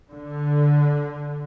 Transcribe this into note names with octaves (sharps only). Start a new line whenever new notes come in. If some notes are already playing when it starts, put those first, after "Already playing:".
D3